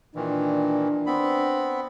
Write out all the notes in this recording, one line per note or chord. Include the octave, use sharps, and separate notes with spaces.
A#2 D#3 E3 D4
B3 C4 B5